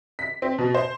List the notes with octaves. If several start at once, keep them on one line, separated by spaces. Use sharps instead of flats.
B6
C4
B2
C5